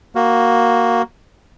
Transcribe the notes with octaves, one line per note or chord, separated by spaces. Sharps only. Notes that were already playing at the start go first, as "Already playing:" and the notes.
A#3 F#4